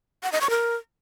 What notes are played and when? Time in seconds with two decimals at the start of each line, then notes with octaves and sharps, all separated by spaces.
0.23 F#5
0.32 D#5
0.41 C#6
0.50 A#4